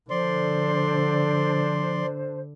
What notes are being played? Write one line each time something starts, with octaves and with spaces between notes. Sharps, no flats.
D3 F3 D4 C5 D5 C6